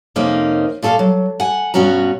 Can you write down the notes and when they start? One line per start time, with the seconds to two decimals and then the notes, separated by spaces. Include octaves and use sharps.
0.16 F2 C3 A#3 C#4 D#4
0.83 A#2 A3 A4 A#4 F5
0.99 F#3
1.40 F#5 G#5
1.74 G2 B2 C#4 F#4 C#5 A#5